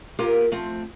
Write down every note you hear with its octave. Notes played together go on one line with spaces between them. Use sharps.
A#3 B3 F4 G4 A#4
F3 A3 C4